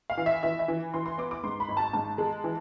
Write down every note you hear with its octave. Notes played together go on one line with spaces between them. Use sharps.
F5
E3
E5
E3 E5
E5
E3
E3 C6
C6
B3 D6
D6
G#2 C6
B5
G#1
A5
G#2 A5
G#3
E3